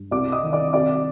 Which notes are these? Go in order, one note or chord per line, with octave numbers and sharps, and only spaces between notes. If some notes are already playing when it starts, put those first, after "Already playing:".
Already playing: G2
C2 D5 D6
D#5 D#6
D#3
D5 D6
C3 D5 D6